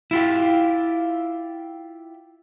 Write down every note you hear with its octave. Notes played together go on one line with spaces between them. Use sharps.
E4 F4 G4